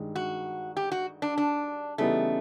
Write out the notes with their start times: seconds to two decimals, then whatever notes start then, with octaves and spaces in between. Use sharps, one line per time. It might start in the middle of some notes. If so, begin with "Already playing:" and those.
Already playing: G2 D#3 G#3
0.16 F#4
0.77 G4
0.92 F#4
1.22 D4
1.38 D4
1.98 C#3 E3 G3 A3 B3 D#4